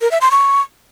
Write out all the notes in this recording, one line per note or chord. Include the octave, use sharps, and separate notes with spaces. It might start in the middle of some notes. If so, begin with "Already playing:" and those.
A#4
E5
C6
C#6